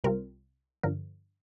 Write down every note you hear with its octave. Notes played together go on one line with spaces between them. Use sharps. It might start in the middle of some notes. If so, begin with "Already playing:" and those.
C2 C3 G3 C4 F4 A#4
G2 D3 F3 A#4